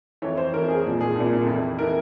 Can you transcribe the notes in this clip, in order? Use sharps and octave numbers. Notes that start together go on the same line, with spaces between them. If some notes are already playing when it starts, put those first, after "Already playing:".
F2 E3 C#5
C5
F2 E3 A#4
G#4
C2 A#2
G#4
C2 A#2
F2 E3
E3 A#4